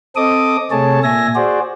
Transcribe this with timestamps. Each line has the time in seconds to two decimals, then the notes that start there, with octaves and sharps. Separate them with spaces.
0.16 C4 A4 D#5 D6 D#6
0.71 C3 A3 G#4 C#5 A5
1.04 A#2 E5 G#5 A#6
1.35 F#4 G#4 C5 D5